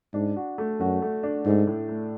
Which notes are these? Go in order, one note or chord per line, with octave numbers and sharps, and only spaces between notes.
G#2 D4
F#4
A3
F#2 F#4
A3
D4
G#2 A3
A2
A3